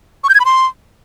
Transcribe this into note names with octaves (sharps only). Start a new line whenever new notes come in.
C#6
G6
G#6
B5
C6